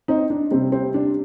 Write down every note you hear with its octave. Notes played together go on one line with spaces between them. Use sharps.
C4 D#4
D4
C3 G3 C4
C4
D4